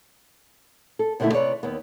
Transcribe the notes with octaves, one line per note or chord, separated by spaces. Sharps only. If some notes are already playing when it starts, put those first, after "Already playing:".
A4
D#2 B2 D3 G#3 A3 E4
C3 B4 C#5 D5
D#2 B3